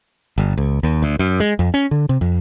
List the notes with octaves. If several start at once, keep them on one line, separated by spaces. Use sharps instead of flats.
G1
C#2
D#2
D2
F#2
G#3
F2
C#4
D3
C3
F2